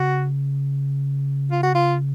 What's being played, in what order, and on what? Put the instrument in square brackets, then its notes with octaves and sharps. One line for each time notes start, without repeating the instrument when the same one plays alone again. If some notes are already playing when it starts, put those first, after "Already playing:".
Already playing: [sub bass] C#3 [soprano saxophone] F#4
[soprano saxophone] F4
F#4
F4